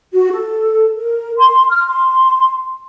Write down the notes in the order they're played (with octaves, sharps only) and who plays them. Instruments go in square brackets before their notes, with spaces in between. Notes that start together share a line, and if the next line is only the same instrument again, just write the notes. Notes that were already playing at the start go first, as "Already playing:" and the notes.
[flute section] F#4
A4
A#4
C6
F6
C6